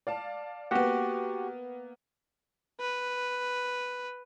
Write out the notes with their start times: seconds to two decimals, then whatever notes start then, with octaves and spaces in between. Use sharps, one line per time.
0.07 D5 F5 A5
0.71 A#3 B3 F#4 G4 F#5
2.80 B4